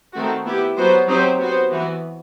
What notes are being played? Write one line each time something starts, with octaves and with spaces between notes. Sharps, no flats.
D#3 A3 C4 F#4
B3 E4 G4
F#3 B3 F#4 C5
F#3 C4 D#4 G4 C5
B3 F#4 C5
E3 B3 F#4